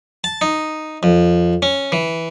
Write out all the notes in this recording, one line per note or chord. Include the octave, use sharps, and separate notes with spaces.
A5
D#4
F2
C#4
E3